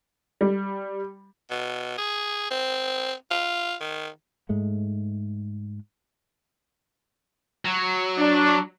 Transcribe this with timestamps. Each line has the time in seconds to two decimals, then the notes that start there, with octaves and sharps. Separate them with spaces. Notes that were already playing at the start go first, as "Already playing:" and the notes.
0.41 G3
1.51 B2
1.98 G#4
2.51 C4
3.31 F4
3.81 D#3
4.49 G#2 G#3 A3
7.65 F#3
8.18 D4